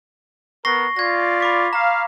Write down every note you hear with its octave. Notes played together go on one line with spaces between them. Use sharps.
B3 A#4 C#6 A#6 C7
F4 D5 G#6 A#6
B5 D6 B6
F5 A#5